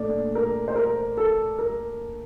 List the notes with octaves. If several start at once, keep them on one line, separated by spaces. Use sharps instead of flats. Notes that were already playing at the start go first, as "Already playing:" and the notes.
Already playing: A#2 A3 D4 D5
A#4
C5
A#4
A4
A#4